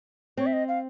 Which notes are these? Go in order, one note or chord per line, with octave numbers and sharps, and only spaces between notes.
C4 C#5
E5
D#5
F5